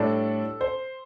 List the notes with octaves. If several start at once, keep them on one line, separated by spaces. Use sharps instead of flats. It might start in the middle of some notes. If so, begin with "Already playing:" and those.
Already playing: A2 G3 D4 A4
C5